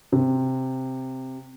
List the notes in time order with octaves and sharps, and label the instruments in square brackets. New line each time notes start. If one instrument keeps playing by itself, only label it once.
[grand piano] C3